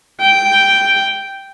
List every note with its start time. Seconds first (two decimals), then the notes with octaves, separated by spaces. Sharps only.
0.21 G5